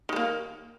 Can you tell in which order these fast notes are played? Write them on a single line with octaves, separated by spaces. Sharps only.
D#3 G#3 A#3